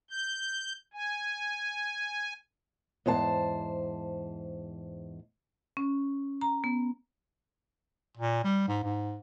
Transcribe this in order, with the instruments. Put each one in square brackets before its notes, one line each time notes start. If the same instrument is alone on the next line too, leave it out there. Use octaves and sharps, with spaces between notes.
[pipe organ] G6
G#5
[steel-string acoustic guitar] E2 G#2 C5 A5
[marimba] C#4
A#5
B3
[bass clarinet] A#2
G3
G#2
G#2